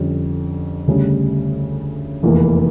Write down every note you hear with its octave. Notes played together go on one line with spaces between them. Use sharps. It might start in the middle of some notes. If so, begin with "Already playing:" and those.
Already playing: F2 D3 G3 C#4
D2 C#3 G3
F1 E2 E3 A#3